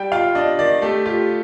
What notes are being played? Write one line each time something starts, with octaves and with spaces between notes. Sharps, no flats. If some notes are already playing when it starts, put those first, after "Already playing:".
Already playing: G3 G5
F4 F5
D4 D#5
D#3 D5
A3 G4
F4 G4